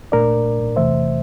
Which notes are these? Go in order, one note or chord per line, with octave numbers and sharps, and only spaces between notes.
A#2 A3 D4 A#4 D5
E2 C3 E3 A3 C5 E5